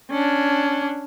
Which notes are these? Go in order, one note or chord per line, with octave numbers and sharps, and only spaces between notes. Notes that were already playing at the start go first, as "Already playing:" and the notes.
C#4 D4